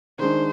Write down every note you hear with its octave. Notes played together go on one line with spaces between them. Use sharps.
D#3 G#3 D4 C5